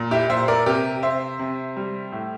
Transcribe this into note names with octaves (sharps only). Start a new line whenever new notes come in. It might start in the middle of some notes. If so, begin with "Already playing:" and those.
Already playing: A#2
E4 G4
A#2 C5 E5
A#4 D5
C3 G4 A#4
C3 C5 E5
C3
G3
A2